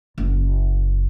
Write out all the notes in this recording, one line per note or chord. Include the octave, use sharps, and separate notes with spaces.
F#1